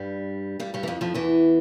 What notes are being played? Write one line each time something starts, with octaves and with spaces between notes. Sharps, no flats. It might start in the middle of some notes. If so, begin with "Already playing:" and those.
Already playing: G2 G3
G2 G3
G2 G3
E3
F2 F3
F2 F3
E2 E3